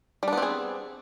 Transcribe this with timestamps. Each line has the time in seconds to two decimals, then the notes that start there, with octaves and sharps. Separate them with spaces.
0.23 G3
0.28 D4
0.33 B3
0.37 C4
0.42 G#4